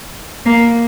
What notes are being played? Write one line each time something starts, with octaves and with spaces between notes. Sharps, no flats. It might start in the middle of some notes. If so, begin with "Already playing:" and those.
A#3